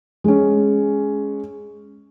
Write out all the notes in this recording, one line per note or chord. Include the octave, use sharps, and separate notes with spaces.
G#3 C#4